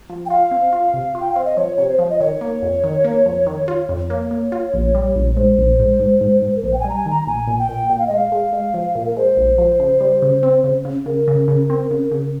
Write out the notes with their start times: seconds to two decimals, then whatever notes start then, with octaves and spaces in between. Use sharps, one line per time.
0.10 F3
0.26 G5
0.30 F4 F5
0.51 C4
0.72 F4
0.94 C3
1.15 F4
1.21 G5
1.32 C4 F5
1.45 D#5
1.56 F3 C#5
1.77 C3 C#5
1.89 C5
1.99 F3
2.10 D#5
2.20 D#3 C#5
2.41 A#3
2.62 F2
2.84 D#3
3.04 A#3
3.26 F2
3.47 D#3
3.68 F4
3.89 F2
4.10 A#3 C#5
4.31 A#3
4.52 F4
4.73 A#1
4.95 G3
5.16 A#1
5.36 G#2 C5
5.58 A#1
5.79 G#2
5.99 G#2
6.21 G#2
6.42 G#2
6.56 A#4
6.63 A#1 C5
6.73 G5
6.79 G3 G#5
6.89 A#5
6.95 G#5
7.06 D#3 A#5
7.27 A#1 G#5
7.47 A#2
7.59 G5
7.69 A#2
7.90 A#2 G5
7.98 F5
8.07 D#5
8.11 G#3
8.16 F5
8.32 G#3
8.53 G#3
8.74 F3
8.95 A#2
9.05 A#4
9.17 G#3 C5
9.37 A#1
9.58 F3
9.80 C#3
10.01 G3
10.22 C#3
10.43 C4
10.64 C#3
10.85 C#3
11.06 C#3 A#4
11.28 C#3
11.48 C#3
11.70 C4
11.91 C#3
12.11 C#3